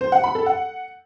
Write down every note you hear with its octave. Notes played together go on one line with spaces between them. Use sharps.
C5
F#5
B5
A4
F#5